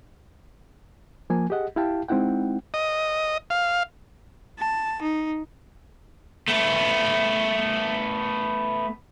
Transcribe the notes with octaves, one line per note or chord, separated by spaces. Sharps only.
F3 A#3 G#5
G4 G#4 D#5 F#5
E4 G4 F5 G5 A5
G#3 C4 D#4 E4 F#5 G5
D#5
F5
A5
D#4
A3 B3